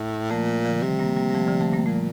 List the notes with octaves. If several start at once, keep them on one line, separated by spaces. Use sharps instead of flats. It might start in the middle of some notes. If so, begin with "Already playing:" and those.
Already playing: A2
A#2 F3 A3
D3 F3
C3 D#3 G3
G3 A#3
G3 A#3
G3
F3 A3
D3 F3
F3 A3
G3 A#3
A#2 F3 A3